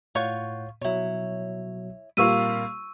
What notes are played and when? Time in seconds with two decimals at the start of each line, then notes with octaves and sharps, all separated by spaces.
0.15 A2 F4 C#5 F#5 C#6 G6
0.81 B2 F#3 E4 C#5
2.17 A#2 G3 A#3 C4 F4 C#6 E6 D#7